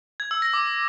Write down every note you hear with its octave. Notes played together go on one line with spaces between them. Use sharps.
G#6
E6
A#6
D6